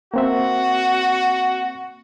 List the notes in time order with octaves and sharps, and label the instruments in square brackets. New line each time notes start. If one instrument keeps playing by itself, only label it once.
[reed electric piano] A#3 C4 E5 [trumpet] F#4